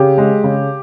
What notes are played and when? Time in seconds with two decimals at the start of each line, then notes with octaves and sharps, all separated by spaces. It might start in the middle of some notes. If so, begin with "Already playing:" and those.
Already playing: C#3 G4
0.18 G#3
0.44 C#3